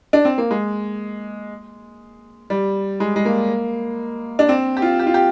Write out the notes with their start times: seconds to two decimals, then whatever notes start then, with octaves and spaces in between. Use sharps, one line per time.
0.13 D4
0.25 C4
0.38 A#3
0.51 G#3
2.50 G3
3.00 G#3
3.16 G#3
3.25 A#3
4.39 D4
4.49 C4
4.77 G4
4.82 F4
4.99 G4
5.07 F4
5.14 G4